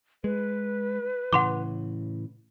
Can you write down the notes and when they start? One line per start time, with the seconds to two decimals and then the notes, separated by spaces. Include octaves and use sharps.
0.24 G#3 B4
1.33 A2 C#3 E3 F#5 C6 D6